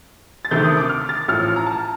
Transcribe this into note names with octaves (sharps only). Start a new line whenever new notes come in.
A6
D2 C3 D#3 A3 G6
D#6
D6
F6
A6
A1 A2 F3 F6
A#5
A5